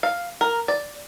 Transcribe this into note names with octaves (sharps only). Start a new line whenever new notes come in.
F5
A#4
D5